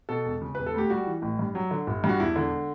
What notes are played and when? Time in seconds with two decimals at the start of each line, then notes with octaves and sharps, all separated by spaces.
0.09 B2 A4
0.26 E1
0.42 C#3
0.55 E1 B4
0.66 A4
0.74 D2 G4
0.90 G3 F#4
1.06 E3
1.22 A1
1.39 G2
1.55 F#3
1.71 D3
1.87 G1
2.04 G2
2.09 F#4
2.19 E1 E4
2.36 D3